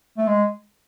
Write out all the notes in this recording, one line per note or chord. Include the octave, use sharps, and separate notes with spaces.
A3
G#3